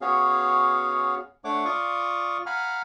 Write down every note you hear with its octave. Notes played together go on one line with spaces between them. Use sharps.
B3 C#4 F#4 G#4 C#5 F5
A3 D4 C#5 F#5 D6
F4 D5 F5 C#6 D#6
F5 F#5 G#5 A#5 B5 F6